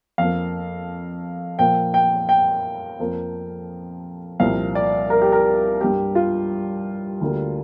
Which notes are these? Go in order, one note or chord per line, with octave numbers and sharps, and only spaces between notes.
F2 F3 A#3 F5
A#2 F3 A#3 G5
G5
G5
F2 F3 A#3
C2 A#2 F3 F5
D5
A#4
G4
A#4
G2 G3 A#3 G4
F4
D2 D3 G3 A#3